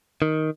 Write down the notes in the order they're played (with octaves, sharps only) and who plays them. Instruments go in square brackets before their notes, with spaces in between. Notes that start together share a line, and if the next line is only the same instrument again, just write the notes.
[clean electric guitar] D#3